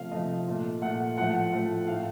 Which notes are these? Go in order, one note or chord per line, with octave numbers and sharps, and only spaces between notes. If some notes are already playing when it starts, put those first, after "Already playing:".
Already playing: C3 F3 A3 F5
C3 F3 A3 D#5
A#2 A3
A#2 A3 F#5
A2 F3 A3 F#5
A2 F3 A3
A2 A3 F5